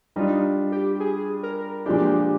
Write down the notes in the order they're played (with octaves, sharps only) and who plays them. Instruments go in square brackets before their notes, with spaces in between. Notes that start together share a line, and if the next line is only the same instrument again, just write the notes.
[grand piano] G3 D4 F4 [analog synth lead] D#4
[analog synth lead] G4
G#4
A#4
[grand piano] A#2 F3 G#3 D4 [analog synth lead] G4